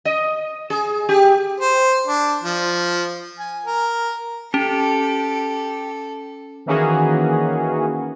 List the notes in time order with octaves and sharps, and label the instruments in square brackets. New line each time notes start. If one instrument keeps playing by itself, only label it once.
[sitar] D#5
G#4
G4
[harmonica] C5
D4
F3
G#5
A#4
[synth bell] C#4 [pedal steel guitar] G4 [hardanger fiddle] A4
[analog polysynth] D#3 E3 A#3 C#4 F#4 G#4